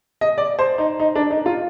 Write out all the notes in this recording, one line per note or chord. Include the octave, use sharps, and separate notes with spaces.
D#5
D5
C5
D#4
D#4
D4
D#4
F4